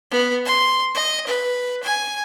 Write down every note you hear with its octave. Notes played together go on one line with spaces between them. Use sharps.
B3
C6
D#5
B4
G#5